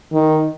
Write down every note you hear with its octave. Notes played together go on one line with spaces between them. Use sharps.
D#3